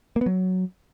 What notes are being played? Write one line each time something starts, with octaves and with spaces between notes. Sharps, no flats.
A#3
B3
F#3